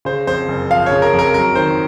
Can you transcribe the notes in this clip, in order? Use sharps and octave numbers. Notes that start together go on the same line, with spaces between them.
C#3 C5
F2 C5
F#1
F3 F5
C#3 C#5
A#4
F2
A#4
F#3 A#4
D#3 C5